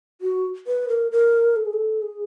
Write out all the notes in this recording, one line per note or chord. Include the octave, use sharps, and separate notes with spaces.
F#4
B4
A#4
A#4
A4
G#4
A4
G#4